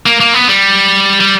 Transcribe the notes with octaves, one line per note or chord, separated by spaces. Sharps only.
A#3
A#3
B3
G3
G3